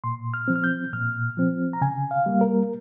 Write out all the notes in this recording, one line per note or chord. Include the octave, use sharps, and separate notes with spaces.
A#2 C6
F6
F3 C4
F6
G6
A#2 F6
F3 C4
A#5
C#3 G#5
F5
G3 A#3
A#4